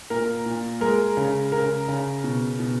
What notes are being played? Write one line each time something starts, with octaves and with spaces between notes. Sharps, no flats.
A#2 A#4
A#2
G#3 A#4
C#3
C#3 A#4
C#3
B2
B2